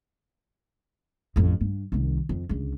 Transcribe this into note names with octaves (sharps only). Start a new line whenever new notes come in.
A1 F2
G2
C2 D#3
F2
C#2 D3